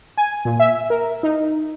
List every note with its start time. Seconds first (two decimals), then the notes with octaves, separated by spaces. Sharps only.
0.17 G#5
0.45 A#2
0.60 E5
0.90 A#4
1.23 D#4